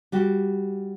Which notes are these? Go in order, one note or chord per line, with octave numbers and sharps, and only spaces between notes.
G3 F#4 G4